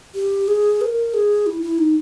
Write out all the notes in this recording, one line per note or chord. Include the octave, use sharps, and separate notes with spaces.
G4
G#4
B4
A#4
G#4
E4
E4
D#4